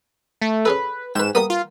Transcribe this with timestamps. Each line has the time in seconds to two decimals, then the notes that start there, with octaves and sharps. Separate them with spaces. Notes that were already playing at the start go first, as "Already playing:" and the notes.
0.42 A3
0.65 C#4 G#4 A4 B4
1.15 G#2 B4 G5 E7
1.35 G3 A#3 B3 D#6
1.50 F4